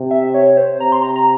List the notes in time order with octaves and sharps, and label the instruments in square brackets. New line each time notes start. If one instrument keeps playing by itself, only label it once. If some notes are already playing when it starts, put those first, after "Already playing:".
Already playing: [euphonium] C3
[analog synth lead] E5
C#5
C5
[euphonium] C3 [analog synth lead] A#5
[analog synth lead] C6
A#5
A#5